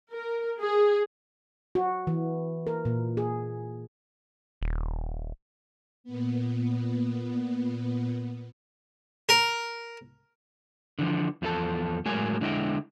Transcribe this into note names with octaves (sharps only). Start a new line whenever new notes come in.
A#4
G#4
F#4
E3
A#4
A#2
G#4
D#1
A#2 B3
A#4
D3 E3 F3
E2 F3 E4 A4 A5
A2 F#3 G#3 A#4 G#5
D3 G#3 E4 D#5 G5